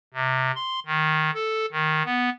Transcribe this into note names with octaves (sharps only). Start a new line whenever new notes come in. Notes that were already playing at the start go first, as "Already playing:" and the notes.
C3
C6
D#3
A4
D#3
B3